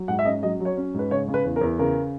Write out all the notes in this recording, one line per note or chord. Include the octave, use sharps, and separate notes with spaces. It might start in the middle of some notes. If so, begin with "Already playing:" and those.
Already playing: F#3
G#2 F#5
E5
C#4 D#5
F#3 D#5
F#3 C#5
C#4
G#2 B4
C#3 C#5
C#3
B4
E2
A#4
E2
C#3 A#4